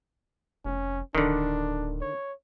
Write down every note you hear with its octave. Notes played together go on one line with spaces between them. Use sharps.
F1 C#4
D1 D3 D#3 D4
C#5